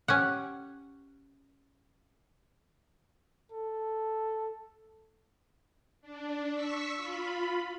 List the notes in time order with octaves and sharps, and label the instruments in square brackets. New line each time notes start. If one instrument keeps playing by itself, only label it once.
[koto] C#4 G4 F#5
[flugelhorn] A4
[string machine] D4
C#6 E6 B6
F4 B5